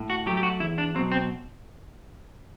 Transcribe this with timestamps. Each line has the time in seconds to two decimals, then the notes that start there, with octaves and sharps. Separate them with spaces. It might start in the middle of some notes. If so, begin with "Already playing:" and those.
Already playing: A2
0.10 F#4
0.26 F#3 A3 G4
0.37 G4
0.43 F#4
0.60 E2 E4
0.78 D4
0.95 F#3 C4
0.99 B2
1.12 C4